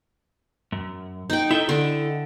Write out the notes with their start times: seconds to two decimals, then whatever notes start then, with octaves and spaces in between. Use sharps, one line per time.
0.72 F#2
1.30 D#4 G5
1.51 E4 A4 D#5 E5
1.69 D3